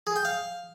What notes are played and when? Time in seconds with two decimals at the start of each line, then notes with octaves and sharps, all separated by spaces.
0.07 G#4
0.16 G5
0.25 F5